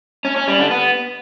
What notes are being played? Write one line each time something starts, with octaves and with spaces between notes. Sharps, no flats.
C#4
C#4
G3
D3
B3